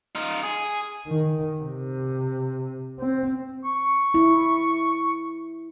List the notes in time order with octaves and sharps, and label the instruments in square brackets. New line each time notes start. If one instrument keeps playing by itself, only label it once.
[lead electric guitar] D#4 F4
G#4
[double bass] D#3
C3
C4
[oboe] C#6
[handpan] E4